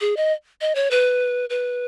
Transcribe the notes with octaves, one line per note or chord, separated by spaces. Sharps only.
G#4
D#5
D#5
C#5
B4
B4